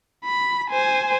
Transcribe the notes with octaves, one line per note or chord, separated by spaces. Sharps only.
B5
C5 G#5